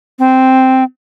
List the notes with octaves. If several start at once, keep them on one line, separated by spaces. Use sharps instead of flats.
C4